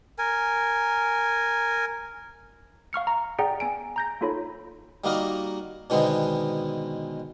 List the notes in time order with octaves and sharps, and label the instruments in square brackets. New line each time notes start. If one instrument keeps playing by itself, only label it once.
[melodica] A#4 G#5
[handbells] F5 C#6 F6 C#7
A#5
G#4 D5 F#5 G5 A#5
B3 G#5 D7
A#5 G6 A#6
A#3 D#4 F4 A4 C#5 B5
[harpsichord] G3 A#3 D#4 F#4 A#4 D#5
B2 D3 D#3 G#3 B3 C4